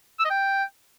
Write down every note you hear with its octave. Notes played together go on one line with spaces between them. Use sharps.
E6
D#5
G5